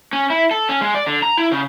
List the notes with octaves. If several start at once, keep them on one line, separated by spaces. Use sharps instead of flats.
C#4
E4
A4
C#4
G#3
D5
D3
A#5
E4
C#3